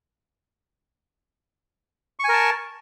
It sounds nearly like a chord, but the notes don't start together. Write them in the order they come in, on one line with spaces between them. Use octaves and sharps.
C#6 G#5 A#4 A5